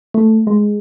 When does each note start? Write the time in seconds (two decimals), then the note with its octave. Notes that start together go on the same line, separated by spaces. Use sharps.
0.14 A3
0.47 G#3